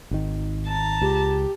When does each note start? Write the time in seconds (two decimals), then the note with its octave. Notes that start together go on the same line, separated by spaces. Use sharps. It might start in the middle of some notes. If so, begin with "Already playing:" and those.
0.11 G#1 D#3
0.67 A5 A#5
1.01 C#2 G4